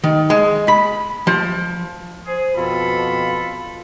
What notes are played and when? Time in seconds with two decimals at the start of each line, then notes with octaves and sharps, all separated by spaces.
0.04 D#3
0.30 G#3
0.68 B5
1.27 F3
2.26 G#4 C5
2.56 F2 B2 F4 A4 B5